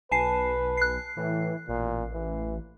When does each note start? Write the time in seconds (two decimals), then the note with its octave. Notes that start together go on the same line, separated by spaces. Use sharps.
0.11 B1 B4 G#5 A5 C7
0.77 F#6 C7
1.17 A2 E3
1.68 A1 A#2
2.14 E3